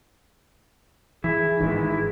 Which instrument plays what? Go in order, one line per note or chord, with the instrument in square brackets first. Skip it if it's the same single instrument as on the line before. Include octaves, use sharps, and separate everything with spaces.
[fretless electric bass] E3 [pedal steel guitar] E4 [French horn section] G#4
[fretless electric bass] G#1 D#3 [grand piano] E3 G#3